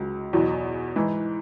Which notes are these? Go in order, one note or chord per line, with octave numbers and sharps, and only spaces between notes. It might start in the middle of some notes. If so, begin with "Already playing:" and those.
Already playing: C#2 C#3 F#3
E2 B2 F#3
G#2 E3